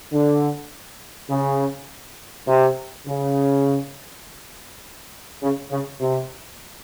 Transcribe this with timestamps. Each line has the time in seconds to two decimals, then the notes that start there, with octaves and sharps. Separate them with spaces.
0.13 D3
1.30 C#3
2.48 C3
3.07 C#3
5.43 C#3
5.71 C#3
6.01 C3